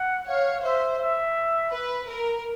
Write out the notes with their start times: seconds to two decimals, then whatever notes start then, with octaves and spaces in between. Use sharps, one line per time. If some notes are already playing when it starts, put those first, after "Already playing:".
Already playing: F#5
0.27 C#5 F5
0.63 C5 E5
1.00 E5
1.72 B4
2.09 A#4